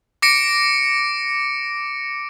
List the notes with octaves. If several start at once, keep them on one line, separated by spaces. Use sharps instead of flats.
D6 A#6 C#7 D7